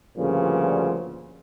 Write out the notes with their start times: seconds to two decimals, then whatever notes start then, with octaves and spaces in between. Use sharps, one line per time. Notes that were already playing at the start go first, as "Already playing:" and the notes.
0.17 D2 G2 A#2 C#3 F3